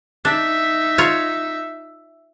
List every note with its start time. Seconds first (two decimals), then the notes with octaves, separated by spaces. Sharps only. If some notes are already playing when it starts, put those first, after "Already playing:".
0.25 D4 D#4 E5
0.98 F4 C#5